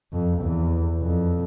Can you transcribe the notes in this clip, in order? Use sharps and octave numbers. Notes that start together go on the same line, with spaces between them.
F2
E2
F2